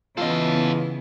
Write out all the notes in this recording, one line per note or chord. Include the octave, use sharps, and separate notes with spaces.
C#3 E3 B3 E4 F4 A4 D#5 F5